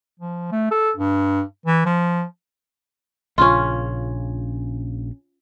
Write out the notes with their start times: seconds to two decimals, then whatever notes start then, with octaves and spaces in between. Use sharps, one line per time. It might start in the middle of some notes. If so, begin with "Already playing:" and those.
0.20 F3
0.52 A3
0.71 A4
0.97 G2
1.66 E3
1.86 F3
3.38 A#1 C#3 C#4 F4